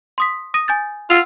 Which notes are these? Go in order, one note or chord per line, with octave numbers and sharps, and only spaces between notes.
C6 D#6 B6
D#6 A#6 D#7
G#5 G6 A6
F4 F#5 E6 F7